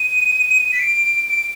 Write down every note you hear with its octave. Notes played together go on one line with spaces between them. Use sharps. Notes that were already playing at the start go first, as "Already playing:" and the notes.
Already playing: D#7
B6
D7
D7